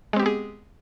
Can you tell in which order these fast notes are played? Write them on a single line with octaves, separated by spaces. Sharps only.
G#3 C4 G4 B3 G#4